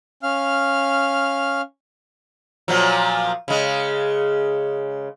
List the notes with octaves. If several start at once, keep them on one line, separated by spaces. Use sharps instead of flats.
C#4 F5 F6
A#2 F3 F#3
C#3 G#3